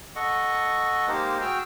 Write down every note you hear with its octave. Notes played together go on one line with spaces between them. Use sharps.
A4 D#5 F#5 C#6
G#3 A#3 D#4 G4 A#4 C5
F#4 G#4 G5 E6 F6